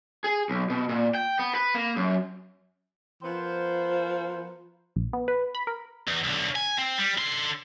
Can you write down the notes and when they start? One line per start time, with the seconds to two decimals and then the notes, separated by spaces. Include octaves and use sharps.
0.24 G#4
0.50 B1
0.70 B2
0.89 A#2
1.15 G5
1.39 B3
1.55 B4
1.75 A#3
1.96 F#2
3.23 F3 B3 A#4 C5
4.96 A#1
5.13 B3
5.28 B4
5.55 B5
5.67 A#4
6.08 E2
6.24 B1 D3
6.55 G#5
6.78 C4
6.98 G3
7.18 D3 C6